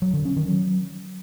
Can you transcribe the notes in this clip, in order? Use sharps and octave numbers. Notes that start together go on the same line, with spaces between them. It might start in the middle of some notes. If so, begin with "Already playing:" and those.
F#3
D3
C#4
D#3
F#3